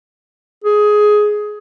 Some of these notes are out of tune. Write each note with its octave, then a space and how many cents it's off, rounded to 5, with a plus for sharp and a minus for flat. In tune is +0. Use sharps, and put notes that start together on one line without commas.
G#4 +15